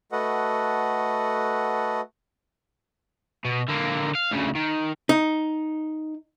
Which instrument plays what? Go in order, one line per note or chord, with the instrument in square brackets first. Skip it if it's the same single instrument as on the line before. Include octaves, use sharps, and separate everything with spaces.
[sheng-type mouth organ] A3 F#4 A4 B4 D#5 F#5
[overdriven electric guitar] B2
D3 A#3
F5
D2 C#3
D#3
[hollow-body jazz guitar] D#4